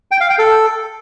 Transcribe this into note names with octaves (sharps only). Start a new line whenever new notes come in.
G5
F5
G5
A4